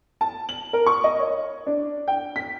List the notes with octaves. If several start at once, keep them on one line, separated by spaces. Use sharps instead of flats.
A5
F#7
A#4
C#6
D#5
C#5
D4
G5
B6